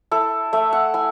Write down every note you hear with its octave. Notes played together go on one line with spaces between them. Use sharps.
E4 A4
A3 E5
F#5
E4 G#5